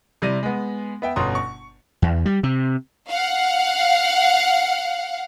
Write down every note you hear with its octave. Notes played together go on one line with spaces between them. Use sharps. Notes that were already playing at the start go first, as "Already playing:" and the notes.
C3 G3 E4 A#6 D#7
G#3 B3
B3 E5 G5
G1 B2 C#4 A#5 C6 D#6
C#6
E2
G3
C3
F5 F#5